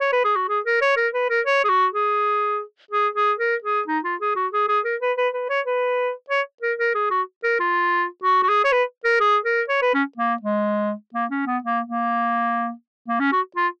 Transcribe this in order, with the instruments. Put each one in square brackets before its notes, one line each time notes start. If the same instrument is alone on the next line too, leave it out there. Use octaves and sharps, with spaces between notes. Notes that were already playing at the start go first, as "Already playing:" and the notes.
[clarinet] C#5
B4
G#4
F#4
G#4
A#4
C#5
A#4
B4
A#4
C#5
G#4
F#4
G#4
G#4
G#4
A#4
G#4
D#4
F4
G#4
F#4
G#4
G#4
A#4
B4
B4
B4
C#5
B4
C#5
A#4
A#4
G#4
F#4
A#4
F4
F#4
F#4
G#4
C#5
B4
A#4
G#4
A#4
C#5
B4
C#4
A#3
G#3
A#3
C#4
B3
A#3
A#3
A#3
C#4
F#4
F4